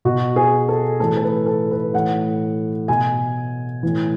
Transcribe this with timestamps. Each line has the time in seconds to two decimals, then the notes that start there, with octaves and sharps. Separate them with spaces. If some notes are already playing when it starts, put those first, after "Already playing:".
0.05 B2 F#4
0.36 G#4
0.69 A4
1.00 A2 E3 A4
1.17 A4
1.23 B4
1.46 A4
1.71 B4
1.94 A2 E3 F#5
2.88 B2 G#5
3.83 A2 E3